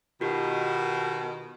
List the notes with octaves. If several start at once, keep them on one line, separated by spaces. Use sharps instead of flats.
B2 D#3 F4 G4